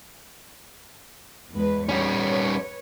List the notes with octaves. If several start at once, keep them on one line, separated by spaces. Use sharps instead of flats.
E2 G#3 B4
G3 C#4 B4 C#5